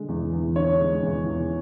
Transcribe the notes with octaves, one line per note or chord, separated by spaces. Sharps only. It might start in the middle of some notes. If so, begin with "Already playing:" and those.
Already playing: D3 G#3
E2
E2
D3 C#5
G#3
E2
E2